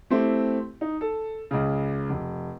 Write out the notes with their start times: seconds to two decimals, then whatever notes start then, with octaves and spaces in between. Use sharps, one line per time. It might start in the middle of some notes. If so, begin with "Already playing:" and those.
0.10 A3 C4 E4 G4
0.81 D#4
1.01 A4
1.51 C#2 C#3
2.10 F1